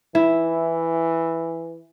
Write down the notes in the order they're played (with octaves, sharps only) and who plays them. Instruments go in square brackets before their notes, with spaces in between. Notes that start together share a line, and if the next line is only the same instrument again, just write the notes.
[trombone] E3 [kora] E4